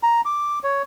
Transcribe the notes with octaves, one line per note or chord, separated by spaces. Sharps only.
A#5
D6
C#5